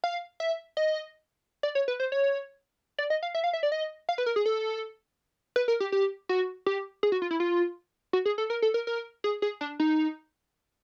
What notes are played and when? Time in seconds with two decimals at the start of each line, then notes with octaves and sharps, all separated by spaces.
0.04 F5
0.40 E5
0.77 D#5
1.63 D5
1.75 C#5
1.88 B4
2.00 C5
2.12 C#5
2.98 D5
3.10 D#5
3.23 F5
3.34 E5
3.44 F5
3.53 E5
3.63 D5
3.72 D#5
4.09 F5
4.18 B4
4.26 A#4
4.36 G#4
4.46 A4
5.56 B4
5.68 A#4
5.80 G4
5.92 G4
6.29 F#4
6.66 G4
7.03 G#4
7.12 F#4
7.22 F4
7.31 E4
7.40 F4
8.13 F#4
8.25 G#4
8.38 A4
8.50 A#4
8.62 A4
8.74 A#4
8.87 A#4
9.24 G#4
9.42 G#4
9.61 D4
9.80 D#4